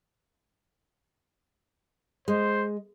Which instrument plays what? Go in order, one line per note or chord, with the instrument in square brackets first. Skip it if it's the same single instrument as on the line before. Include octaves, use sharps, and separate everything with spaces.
[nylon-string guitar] G#3 [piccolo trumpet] C5